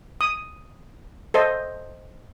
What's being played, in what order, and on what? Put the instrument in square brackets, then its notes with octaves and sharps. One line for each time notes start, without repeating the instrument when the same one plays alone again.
[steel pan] D#6
A4 C5 D#5